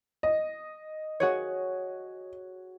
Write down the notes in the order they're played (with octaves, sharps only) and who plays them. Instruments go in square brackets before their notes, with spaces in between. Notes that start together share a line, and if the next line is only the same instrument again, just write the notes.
[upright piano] D#5
[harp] F#4 G#4 C#5